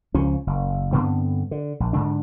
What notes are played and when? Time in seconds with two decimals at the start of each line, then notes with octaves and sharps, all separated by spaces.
0.14 C#2 F3 C#4
0.47 F#1
0.93 G2 D3 B3 C4
1.51 D3
1.80 A#1
1.93 G#2 D3 D4